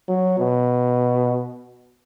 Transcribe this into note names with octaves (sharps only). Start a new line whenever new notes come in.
F#3
B2